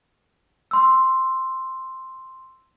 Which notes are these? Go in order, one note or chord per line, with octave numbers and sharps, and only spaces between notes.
C6 E6